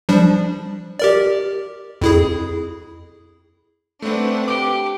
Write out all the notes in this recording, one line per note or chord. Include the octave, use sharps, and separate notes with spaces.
F3 G3 D4
G4 A#4 D5
F2 E4 G#4
A3 C4 D4 B4 F#5
G4 D6